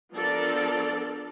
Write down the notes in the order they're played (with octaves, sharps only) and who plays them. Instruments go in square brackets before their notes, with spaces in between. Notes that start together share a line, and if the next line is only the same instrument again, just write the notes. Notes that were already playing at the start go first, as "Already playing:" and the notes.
[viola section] F3 B3 D4 A4 A#4 D5